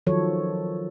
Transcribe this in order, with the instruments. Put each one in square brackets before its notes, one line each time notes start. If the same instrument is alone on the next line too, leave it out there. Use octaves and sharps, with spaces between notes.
[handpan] D#3 F3 F#3 A4 C#5